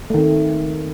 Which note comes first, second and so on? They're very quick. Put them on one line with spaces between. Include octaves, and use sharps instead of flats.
A3 D#3 C4